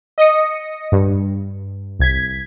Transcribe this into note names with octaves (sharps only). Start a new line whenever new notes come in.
D#5 D#6 A#6 C#7
G2
C2 G#6 B6